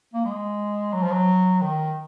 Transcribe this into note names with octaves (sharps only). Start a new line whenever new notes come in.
A#3
G#3
F#3
F3
F#3
D#3